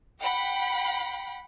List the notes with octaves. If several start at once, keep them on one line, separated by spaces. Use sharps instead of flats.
F#5 G5 B5